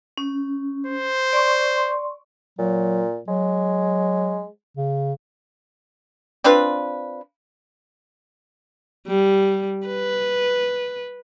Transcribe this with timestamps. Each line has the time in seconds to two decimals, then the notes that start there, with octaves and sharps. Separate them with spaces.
0.18 C#4
0.87 C5
1.33 D5 C6 C#6
2.59 A#2 F#3
3.28 F#3 G#3
4.77 C#3
6.44 C4 D4 F4 B4
9.08 G3
9.87 B4